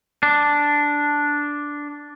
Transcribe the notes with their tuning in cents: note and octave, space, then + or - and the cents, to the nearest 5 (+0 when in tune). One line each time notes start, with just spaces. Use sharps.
D4 -5